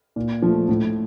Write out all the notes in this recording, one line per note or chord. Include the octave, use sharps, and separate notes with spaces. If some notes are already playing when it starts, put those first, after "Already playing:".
A#2
F3 A3
A2